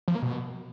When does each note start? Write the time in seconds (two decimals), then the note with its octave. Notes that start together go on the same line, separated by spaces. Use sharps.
0.08 F3
0.15 A#3
0.23 B2